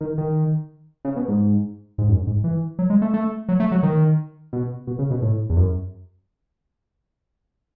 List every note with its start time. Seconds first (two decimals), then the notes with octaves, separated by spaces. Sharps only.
0.01 D#3
0.18 D#3
1.05 C#3
1.16 B2
1.28 G#2
1.98 G#2
2.09 F#2
2.27 G#2
2.44 E3
2.79 F#3
2.90 G#3
3.02 A3
3.14 A3
3.49 F#3
3.60 A3
3.72 F#3
3.83 D#3
4.53 B2
4.87 B2
4.99 C#3
5.10 B2
5.22 A2
5.50 E2
5.57 F#2